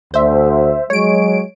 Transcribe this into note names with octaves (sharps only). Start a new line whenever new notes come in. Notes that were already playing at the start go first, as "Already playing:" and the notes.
D2 C5 E5
F#3 G#3 C#5 D7